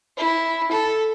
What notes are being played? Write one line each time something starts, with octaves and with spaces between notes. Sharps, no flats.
E4
A4